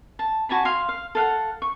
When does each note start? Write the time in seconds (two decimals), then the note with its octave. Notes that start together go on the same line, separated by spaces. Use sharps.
0.19 A5
0.49 F#4 G#5 A5 B5
0.65 F5 C6
0.89 F5
1.15 A4 F5 F#5
1.62 C#6